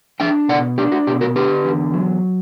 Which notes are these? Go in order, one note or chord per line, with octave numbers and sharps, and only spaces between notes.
D4 E5 G5
B2 D5 F#5
D4 G4
F#4
B2 G4
F#4 A#4
D3 G4 B4
E2
F#3